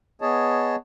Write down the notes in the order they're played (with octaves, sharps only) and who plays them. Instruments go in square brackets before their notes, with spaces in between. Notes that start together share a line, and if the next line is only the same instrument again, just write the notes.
[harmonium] B3 G#4 C#5 D#5 A5